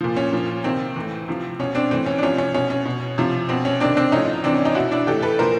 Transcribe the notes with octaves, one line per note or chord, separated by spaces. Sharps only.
A#2 F3
C#4
A#2 F3
C3 D#3 C4
A2 E3
C3 F3
B2 C#4
C4 D4
A2 E3 C4
C#4
D4
C3 F3 C#4
C#4
B2 C#4
C#4
B2
C3 F3
B2 C4
C#4
C3 D#3 C4 D4
C4 D4
A2 F3 C#4 D#4
C3 E3 C4 D4
C#4
C#4 D#4
B2 E4 F#4
D4 E4
A2 E3 G4 A4
A4 B4
A#2 F3 A#4 C5